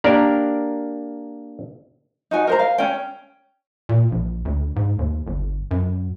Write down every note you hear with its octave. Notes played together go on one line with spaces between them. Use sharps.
A#3 D4 G4 A#4 D5
D#4 F#4 G#5
A#4 C5 A#5
F5
C#4 G5
A#2
A#1
D2
G#2
D#2
G1
F#2